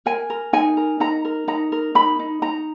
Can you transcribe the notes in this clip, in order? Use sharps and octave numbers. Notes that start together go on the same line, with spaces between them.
A#4 G#5
A#4
D#4 G#5
A#4
D#4 A#5
A#4
D#4 A#5
A#4
D#4 B5
D#4
D#4 A#5